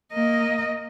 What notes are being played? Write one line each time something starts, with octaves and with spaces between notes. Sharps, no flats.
A#3 D#5